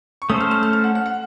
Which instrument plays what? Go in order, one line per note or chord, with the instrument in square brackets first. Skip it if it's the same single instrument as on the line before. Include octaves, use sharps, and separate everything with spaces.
[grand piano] C#6
[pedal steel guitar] A3 C#4 A4 C5 [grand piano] D#6
[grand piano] F6
F6
F6
F6
F#5
F#5
F#5